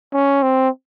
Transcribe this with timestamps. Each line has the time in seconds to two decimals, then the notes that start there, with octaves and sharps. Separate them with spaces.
0.13 C#4
0.42 C4